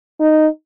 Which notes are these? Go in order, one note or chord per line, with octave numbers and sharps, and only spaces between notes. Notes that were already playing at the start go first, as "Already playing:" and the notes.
D#4